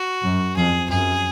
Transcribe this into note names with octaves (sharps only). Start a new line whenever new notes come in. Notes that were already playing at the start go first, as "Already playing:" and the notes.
Already playing: F#4
F#2
F2 G#4
F#2 G#4